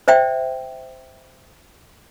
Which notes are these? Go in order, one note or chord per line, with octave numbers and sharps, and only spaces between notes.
C5 D5 E5 G5